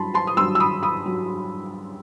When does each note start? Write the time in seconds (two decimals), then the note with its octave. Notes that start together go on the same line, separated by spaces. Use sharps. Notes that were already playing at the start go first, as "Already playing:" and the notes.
Already playing: G2 F#3 A5 B5 C6
0.14 A5 C6
0.27 D#6
0.37 G2 F#3 C6 E6
0.55 E6
0.60 B5 D#6
0.83 B5 D#6
1.06 F#3